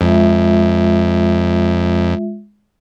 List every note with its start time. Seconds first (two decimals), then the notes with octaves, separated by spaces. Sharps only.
0.01 F2 G#3 F4 E5